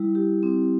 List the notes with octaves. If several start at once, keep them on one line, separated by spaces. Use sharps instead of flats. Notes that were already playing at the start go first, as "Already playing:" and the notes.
Already playing: G3 E4
G4
C4